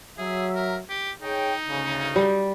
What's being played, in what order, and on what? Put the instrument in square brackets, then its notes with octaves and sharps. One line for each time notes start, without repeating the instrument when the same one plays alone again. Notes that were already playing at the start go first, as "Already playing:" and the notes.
[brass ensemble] F#3 E5 [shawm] G#4
[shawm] A#4
G4
[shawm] D#4 [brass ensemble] G#4 C#5 G5
[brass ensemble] D2 C#3
[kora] G3